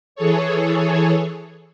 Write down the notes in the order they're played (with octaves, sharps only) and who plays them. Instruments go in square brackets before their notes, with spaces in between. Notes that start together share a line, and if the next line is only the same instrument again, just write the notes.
[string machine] E3 G#4 A4 C#5